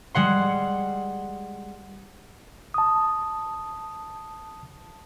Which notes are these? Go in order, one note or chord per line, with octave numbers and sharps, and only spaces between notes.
G3 G#3 F#5 C6
A5 D#6